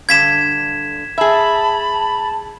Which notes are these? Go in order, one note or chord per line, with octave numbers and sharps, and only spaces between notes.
G2 D3 G#6 B6 E7
G#4 E5 A5 B5